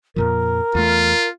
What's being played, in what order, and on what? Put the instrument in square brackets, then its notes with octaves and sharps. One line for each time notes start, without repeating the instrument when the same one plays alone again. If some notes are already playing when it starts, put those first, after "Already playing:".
[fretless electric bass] F2 A#2 F3 [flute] A#4
[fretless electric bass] E2 A3 [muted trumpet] F4